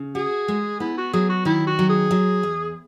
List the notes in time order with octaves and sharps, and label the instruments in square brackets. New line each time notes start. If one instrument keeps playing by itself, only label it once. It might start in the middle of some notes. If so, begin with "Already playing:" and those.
Already playing: [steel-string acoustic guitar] C#3
[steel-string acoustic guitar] F#4 [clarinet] G#4
[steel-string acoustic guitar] G#3
[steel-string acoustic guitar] B3 [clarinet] E4
[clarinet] F#4
[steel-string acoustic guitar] F#3 [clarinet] G#4
[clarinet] F#4
[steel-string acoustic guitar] D#3 [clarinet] E4
[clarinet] F#4
[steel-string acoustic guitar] F#3
[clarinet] G#4
[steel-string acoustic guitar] F#3
E2